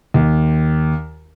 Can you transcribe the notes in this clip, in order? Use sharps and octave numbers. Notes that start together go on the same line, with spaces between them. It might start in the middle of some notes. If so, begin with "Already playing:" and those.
D#2